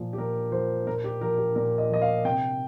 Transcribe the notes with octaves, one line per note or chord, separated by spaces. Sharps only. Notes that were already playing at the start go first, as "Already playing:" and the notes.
Already playing: A#2 F3
G4
A#2 A#4
F3 C5
A#2 A#4
G4
F3 A#4
G4
A#2 A#4
D#5
F3 D#5
F5
C3 G5